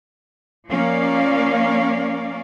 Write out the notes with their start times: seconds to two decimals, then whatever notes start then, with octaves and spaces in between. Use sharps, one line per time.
0.68 F3 A#3 C#4 D5 F5